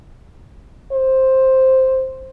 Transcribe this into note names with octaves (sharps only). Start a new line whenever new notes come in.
C5